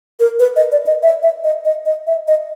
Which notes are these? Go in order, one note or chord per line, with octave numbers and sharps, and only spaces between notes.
A#4
B4
D#5
D5
D#5
E5
E5
D#5
D#5
D#5
E5
D#5